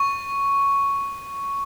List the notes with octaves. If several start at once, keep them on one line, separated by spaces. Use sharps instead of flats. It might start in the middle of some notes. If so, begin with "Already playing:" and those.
Already playing: C#6